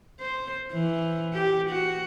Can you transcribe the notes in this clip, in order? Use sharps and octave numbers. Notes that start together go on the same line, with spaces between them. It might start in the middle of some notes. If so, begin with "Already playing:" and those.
C5
E3
G4
F#4